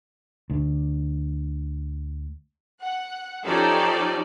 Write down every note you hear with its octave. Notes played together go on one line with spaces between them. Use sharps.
D2 D3
F#5
F3 C#4 D#4 G4 A4 D5